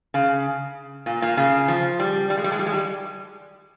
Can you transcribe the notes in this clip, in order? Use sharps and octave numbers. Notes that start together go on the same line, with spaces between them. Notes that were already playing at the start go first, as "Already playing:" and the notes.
C#3
A#2
A#2
C#3
F3
G3
G3
G#3
G3
G#3
G3
G#3
G3